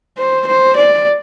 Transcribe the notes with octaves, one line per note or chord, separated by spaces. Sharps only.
C5
C5
D5